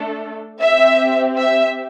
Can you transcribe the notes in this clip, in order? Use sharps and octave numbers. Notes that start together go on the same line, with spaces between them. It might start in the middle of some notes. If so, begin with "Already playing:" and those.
Already playing: A3 D4 A4
C4 G4 E5
E5